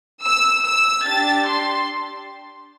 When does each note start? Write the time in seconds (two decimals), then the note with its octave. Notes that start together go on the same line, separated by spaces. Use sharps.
0.23 E6
0.64 E6
1.05 D4 G4 A6
1.46 C6